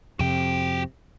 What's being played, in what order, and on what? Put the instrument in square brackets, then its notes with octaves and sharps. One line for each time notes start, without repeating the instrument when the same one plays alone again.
[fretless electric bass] F2 C3 [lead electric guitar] F#4 G5